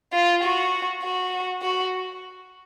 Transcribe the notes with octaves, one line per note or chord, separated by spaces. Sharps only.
F4
F#4
F#4
F#4